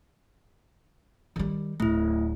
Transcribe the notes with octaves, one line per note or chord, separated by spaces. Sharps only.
D#3 G3
D1 A3 E4